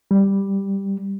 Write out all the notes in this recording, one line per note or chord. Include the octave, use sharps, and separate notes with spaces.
G3